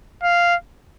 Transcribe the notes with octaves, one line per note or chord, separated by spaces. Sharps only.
F5